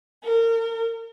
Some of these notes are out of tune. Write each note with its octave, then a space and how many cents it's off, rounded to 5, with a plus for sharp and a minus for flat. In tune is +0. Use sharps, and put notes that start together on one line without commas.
A#4 -30